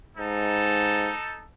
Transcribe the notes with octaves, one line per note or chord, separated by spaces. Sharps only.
G#2 D#4 A4 A5